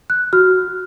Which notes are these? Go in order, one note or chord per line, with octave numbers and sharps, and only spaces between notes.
F#6
F#4 F6